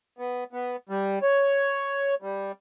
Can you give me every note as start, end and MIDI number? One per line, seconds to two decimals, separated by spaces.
0.19 0.44 59
0.53 0.76 59
0.89 1.19 55
1.22 2.15 73
2.22 2.52 55